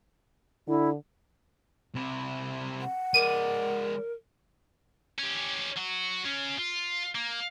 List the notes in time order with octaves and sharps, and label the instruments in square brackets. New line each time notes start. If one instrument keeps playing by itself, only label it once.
[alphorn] D3 [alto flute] E4
[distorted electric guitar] C3 E4
[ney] F#5
[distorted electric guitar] G#3 D5 [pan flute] A#4 [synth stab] D#7
[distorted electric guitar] C#4 G4
F#3 F#4
C#3 C#4
F4
A#3